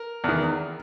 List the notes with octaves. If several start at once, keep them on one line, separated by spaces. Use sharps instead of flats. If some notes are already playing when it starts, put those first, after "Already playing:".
Already playing: A#4
E2 D#3